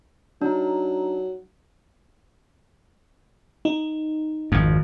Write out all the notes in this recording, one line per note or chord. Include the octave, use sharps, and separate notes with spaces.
F#3 D4 D#4
D#4
G#1 F2